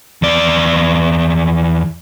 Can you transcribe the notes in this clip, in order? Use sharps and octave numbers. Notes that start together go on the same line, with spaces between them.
E2 D5